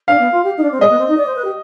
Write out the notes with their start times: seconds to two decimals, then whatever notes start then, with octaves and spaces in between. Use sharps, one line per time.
0.08 D4 F5
0.19 B3
0.32 F4
0.44 G4
0.57 D#4
0.63 D4
0.72 C4
0.80 G#3 D#5
0.90 B3
0.98 C4
1.08 D#4
1.17 D5
1.26 C5
1.36 B4
1.45 G4